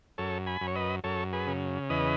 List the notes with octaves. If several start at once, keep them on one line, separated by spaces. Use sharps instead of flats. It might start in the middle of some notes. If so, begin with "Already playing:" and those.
F#2 A4 C#5
G#5 B5
F#2
C#5
B4 D#5
F#2 A4 C#5
G#4 B4
C#3
E2 B4 D#5